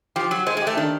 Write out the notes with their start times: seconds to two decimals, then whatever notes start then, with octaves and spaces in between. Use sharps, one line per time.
0.16 F3 G4
0.31 F#3 G4
0.46 G#3 C5
0.57 G#3
0.62 A3 G4
0.77 D#3 D4